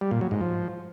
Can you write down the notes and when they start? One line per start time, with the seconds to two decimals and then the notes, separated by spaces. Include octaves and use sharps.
0.01 G3
0.11 A#2
0.21 F#3
0.31 G#2
0.41 F3